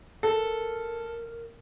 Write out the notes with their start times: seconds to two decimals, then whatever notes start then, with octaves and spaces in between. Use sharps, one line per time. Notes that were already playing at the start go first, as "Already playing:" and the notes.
0.23 A4 A#4